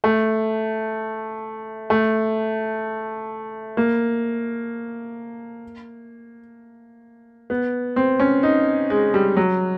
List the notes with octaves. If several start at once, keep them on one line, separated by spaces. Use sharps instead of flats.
A3
A3
A#3
B3
C4
C#4
D#4
G#3
G3
F#3